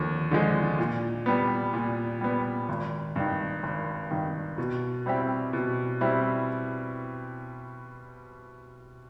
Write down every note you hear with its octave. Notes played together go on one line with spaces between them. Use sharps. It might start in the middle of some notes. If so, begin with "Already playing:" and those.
Already playing: D#2 D3 F3
D3 F3 G#3
A#2
G3 B3
A#2
G3 B3
G#1
G2 D#3
G#1
G2 D#3
B2
G3 C4 E4 G4
B2
G3 C4 E4 G4